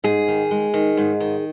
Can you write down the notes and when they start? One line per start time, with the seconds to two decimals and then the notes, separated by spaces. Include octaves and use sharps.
0.04 G#2 G#4
0.28 D#3
0.51 G#3
0.74 D#3
0.97 G#2
1.20 D#3